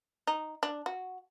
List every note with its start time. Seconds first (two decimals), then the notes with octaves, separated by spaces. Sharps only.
0.27 D#4
0.63 D4
0.86 F#4